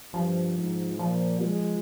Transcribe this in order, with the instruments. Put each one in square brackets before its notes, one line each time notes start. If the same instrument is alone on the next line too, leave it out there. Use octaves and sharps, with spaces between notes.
[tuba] G2 [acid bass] F3
[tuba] G#2
[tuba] A#2 [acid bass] F3
[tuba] G#3